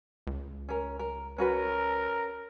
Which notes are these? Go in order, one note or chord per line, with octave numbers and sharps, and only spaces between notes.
C#2
C#4 A#4
A#4
C#4 F#4 A#4 B4